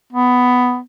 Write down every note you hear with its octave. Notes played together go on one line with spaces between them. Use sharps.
B3